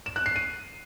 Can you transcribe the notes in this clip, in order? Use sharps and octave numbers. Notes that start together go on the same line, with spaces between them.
E7
F#6
C7
D#7